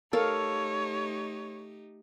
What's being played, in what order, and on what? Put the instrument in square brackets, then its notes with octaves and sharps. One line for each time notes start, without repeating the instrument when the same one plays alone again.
[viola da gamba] A3 D#4 G4 [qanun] A4 F5 [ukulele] A#4 [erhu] C#5